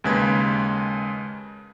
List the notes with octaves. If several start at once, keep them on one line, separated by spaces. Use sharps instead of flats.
D#2 C#3 G#3 B4 G#6